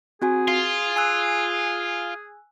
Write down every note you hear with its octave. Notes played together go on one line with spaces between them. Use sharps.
C4 F#4 G#4 G#5
F4 C7
G#5 E6 F#6